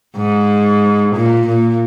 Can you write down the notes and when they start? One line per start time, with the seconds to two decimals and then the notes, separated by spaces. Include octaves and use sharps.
0.17 G#2
1.15 A#2
1.47 A#2